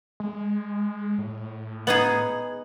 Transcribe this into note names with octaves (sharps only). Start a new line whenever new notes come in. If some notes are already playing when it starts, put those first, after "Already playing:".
G#3
A2
B3 D#4 G#4 B4 F#7